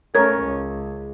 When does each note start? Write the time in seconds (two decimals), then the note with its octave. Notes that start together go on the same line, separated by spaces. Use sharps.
0.15 A3 C#4 A#4 C#5 G#6
0.44 C#2